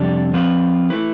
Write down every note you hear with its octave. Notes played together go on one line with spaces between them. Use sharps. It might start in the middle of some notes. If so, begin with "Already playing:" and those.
Already playing: F2 C3 G3 D4
F3 C4 F4 B4
A3 E4 B4